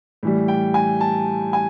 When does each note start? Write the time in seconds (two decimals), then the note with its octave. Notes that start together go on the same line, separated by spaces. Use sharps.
0.23 A2 E3 G3
0.48 G5
0.74 G#5
1.01 A5
1.53 G#5